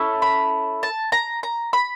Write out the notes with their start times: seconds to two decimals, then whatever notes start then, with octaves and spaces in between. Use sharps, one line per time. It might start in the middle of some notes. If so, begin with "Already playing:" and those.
Already playing: C#4 E4 A4
0.22 B5
0.83 A5
1.12 A#5
1.43 A#5
1.73 B5